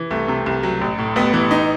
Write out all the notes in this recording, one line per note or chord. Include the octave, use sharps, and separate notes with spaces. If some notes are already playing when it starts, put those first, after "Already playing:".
Already playing: E3
C2 A3
C3
C2
F#3
A1
A2
A1 B3
E3
D#4